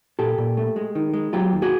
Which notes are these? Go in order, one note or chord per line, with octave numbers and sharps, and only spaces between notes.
A#2 G4 A4
A#2
A3
G#3
D#3
G#3
F#3 F4 G4
D#2
F#4 G#4